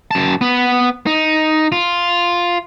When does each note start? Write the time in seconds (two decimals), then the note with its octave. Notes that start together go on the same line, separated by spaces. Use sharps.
0.11 F#2 A5
0.41 B3
1.06 D#4
1.72 F4